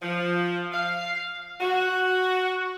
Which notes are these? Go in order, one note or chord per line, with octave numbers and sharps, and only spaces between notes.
F3
F5
F#4